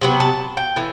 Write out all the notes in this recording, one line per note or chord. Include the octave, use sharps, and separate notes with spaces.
C3 F#3 B3
A5
G5
A2 E3